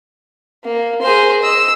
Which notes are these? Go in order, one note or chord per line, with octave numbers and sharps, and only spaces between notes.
A#3
G#4 A#4 C5 C6
D#5 E6